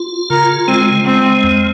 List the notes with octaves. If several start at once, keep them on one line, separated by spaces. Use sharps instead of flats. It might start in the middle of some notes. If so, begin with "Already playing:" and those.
Already playing: F4
C#3 A#4
G#3 C4
G#3 C4
F2